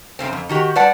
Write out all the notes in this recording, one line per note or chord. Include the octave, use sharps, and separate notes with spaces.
F#2 C#3 C4
F2
D#3 F#4 G4
G3 B4 D5 F#5 A5